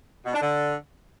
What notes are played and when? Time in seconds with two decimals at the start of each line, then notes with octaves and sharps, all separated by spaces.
0.25 B2
0.33 D4
0.40 D3